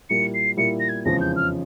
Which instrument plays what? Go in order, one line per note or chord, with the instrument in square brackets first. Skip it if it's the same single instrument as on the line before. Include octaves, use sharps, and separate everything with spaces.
[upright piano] A#2 G3 A#3 E4 [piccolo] C#7
[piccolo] C7
[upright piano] A#2 G3 A#3 E4 [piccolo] C#7
[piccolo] A#6
G#6
[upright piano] F1 E2 C#3 F3 G#3 [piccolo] A#6
[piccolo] G6
F6